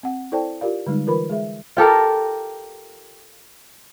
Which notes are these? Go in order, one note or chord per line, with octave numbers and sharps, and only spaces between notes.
C4 F#5
E4 A4 C5 D5 G5 A5
F4 G4 A#4 D5 F5
D3 G3 G#3 D#4
E3 F4 A#4 B4 B5
G#3 G#4 E5
F4 G4 A4 A#4